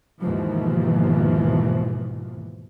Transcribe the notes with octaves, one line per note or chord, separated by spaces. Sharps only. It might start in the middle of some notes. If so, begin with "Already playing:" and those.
D#2 G#2 B2 E3 F3